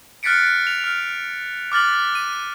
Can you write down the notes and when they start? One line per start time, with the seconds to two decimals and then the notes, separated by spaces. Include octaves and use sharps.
0.23 F6 F#6 A6 B6 C#7 D7
0.67 F7
0.84 F6
1.72 D6 F6 A6 F#7
2.15 D#7